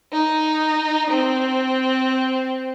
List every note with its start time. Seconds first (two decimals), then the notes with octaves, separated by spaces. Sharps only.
0.12 D#4
1.10 C4